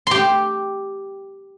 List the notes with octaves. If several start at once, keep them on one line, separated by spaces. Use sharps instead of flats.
G4 C6